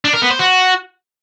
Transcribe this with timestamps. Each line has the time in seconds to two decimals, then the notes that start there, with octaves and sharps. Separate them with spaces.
0.05 D4
0.13 A#4
0.22 B3
0.31 C5
0.39 F#4